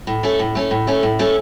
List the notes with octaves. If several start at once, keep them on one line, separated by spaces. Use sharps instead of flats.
A2
A3 C#4 A4
A2
A3 C#4 A4
A2
A3 C#4 A4
A2
A3 C#4 A4